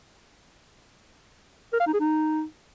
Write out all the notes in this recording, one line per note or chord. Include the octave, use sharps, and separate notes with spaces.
A#4
F5
D#4
G#4
D#4